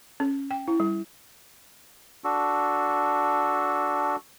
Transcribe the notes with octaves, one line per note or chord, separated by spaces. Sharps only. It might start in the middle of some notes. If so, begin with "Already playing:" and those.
C#4
G5
E4
G3
D4 F#4 A4